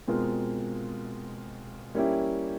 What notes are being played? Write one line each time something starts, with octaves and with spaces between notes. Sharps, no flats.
B2 G#3 C4 F4 A#4
G3 A#3 C#4 E4 G4